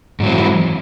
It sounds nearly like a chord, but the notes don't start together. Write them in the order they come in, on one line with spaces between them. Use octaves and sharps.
G#2 F#3 C4 E3